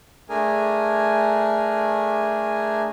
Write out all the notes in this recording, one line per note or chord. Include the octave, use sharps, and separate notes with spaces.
A3 D4 G#4 A#4 G#5